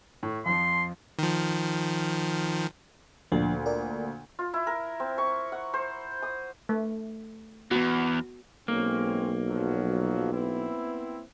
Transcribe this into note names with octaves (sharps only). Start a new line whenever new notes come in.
A2
F2 F3 C6
D#3 F3
D2 A#2 F3 D4
A#4 D5
F4
E4
A#4
C4
C#6
F#5
C5
D#6
A3
E2 B3 F#4
B1 G#3 A#3 C4 C#4
A#2 F3 F#3
B3 C4 E4